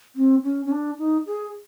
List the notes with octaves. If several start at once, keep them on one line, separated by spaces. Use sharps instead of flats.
C4
C#4
C#4
D4
D#4
G#4